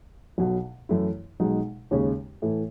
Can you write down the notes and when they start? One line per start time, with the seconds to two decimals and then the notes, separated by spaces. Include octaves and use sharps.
0.38 B1 B2 F#3
0.89 F#2 E3 A3 E4
1.40 B1 B2 G#3 D#4
1.91 D#2 C#3 G#3 C#4
2.42 A2 E3 A3